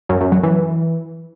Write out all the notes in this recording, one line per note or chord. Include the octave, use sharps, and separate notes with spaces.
F#2
F#2
F#3
E3